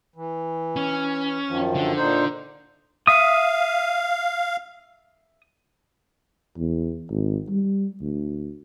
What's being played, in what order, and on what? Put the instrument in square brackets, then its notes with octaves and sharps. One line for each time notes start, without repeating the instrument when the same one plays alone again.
[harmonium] E3
[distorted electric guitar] C#4
[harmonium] F#2 D#3 F3
[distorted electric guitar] D3
[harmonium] A#2 D#4 C5
[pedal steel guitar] E5 D#6 [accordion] F5
[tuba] E2
G#1
G3
D2